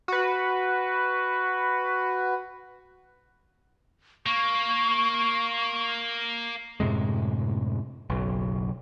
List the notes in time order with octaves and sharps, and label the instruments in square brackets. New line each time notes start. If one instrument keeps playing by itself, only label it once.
[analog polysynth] F#4 B4
[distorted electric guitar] A#3 [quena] C#6
[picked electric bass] F#2 A2 C3 G#3
F#1 B1